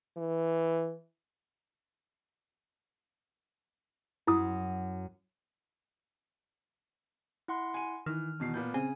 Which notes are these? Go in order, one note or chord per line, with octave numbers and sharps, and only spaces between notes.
E3
F#2 E4 D#6
E4 F#5 C6
G#5 D#7
D#3 E3 F6
E2 B2 C7
A#2 B3 G6
C#3 C4 G#5